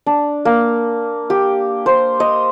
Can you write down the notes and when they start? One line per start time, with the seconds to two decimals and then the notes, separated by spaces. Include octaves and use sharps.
0.06 D4
0.45 A#3
1.30 G4
1.86 C5
2.20 D#5